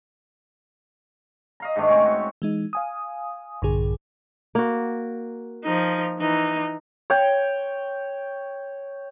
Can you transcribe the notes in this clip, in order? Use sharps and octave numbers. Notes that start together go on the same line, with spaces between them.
D#5 F5 A#5
G#2 D#3 A3 D4
C4 C#4 C#5
F#4
E3 G#3 D#4
F5 G#5 D#6
A#1 G2 D3 G#4
A#3 F#4
F3 D#4
E3 D#4
C#5 G5